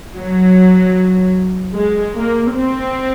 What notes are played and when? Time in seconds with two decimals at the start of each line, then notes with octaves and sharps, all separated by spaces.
0.16 F#3
1.74 G#3
2.15 A#3
2.54 C4